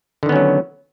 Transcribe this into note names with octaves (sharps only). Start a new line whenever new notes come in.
D3 D#3 F#3 B3 C#4